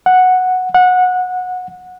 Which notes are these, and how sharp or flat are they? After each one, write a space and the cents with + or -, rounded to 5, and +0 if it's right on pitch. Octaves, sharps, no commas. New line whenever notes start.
F#5 -5
F#5 -20